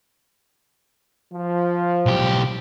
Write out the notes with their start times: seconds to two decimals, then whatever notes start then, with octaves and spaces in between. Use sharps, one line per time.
1.32 F3
2.06 B1 G4